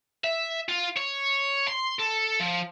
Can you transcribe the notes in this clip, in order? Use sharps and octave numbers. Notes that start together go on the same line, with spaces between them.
E5
F4
C#5
C6
A4
F3